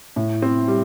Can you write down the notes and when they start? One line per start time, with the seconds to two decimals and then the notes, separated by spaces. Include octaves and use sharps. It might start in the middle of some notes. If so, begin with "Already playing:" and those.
0.16 A2
0.42 C4
0.68 G3